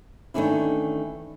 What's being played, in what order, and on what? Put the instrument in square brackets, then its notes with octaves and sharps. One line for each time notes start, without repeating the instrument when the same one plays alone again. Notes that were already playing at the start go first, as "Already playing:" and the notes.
[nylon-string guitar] D#3 E3 A3 C#4 D4 E4